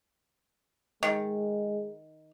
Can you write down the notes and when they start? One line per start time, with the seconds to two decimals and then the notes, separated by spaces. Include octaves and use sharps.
1.03 D#3 G#3